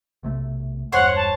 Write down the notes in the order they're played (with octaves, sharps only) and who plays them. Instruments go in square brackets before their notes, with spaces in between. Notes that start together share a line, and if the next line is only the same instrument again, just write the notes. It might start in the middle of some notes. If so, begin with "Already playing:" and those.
[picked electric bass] B1 C3 A3
[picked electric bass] E1 G2 [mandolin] C5 C#5 C6 [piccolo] F#5
[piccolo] A5